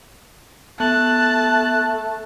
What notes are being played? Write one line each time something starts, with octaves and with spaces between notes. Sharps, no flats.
A3 B3 A5 F#6